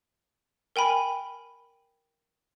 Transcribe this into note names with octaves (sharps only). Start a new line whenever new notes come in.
A#4 G5 G#5 B5